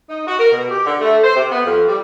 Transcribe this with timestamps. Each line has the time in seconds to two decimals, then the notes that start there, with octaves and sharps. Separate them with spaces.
0.09 D#4
0.27 F#4
0.39 A#4
0.52 B2
0.71 G4
0.86 D3
1.01 A3
1.23 C5
1.35 C3
1.52 B3
1.64 F2
1.88 G3